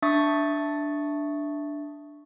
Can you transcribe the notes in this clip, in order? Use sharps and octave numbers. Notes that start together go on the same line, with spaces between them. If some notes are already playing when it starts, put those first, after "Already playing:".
D4 E5 C#6 D#6 A6